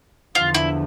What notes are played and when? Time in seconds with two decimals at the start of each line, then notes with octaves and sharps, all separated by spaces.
0.35 E2 D3 F3 F4
0.54 E4